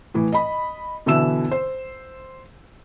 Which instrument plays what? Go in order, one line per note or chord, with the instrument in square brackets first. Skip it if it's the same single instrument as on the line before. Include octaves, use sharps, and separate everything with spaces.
[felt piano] A2 E3
D#5 B5
B2 D3 E3 E5 E6 E7
C5